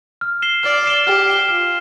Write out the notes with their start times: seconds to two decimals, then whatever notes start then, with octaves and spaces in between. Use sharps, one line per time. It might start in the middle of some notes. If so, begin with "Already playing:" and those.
0.21 F6
0.42 C7 E7 G7
0.63 D5 F6
0.86 C7 E7 G7
1.06 G4 F6
1.28 C7 E7 G7
1.48 F4 F6